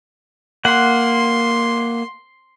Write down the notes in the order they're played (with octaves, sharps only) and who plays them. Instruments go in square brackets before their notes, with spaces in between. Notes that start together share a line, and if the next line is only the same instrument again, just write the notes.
[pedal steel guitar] A#3 F#5 [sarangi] C6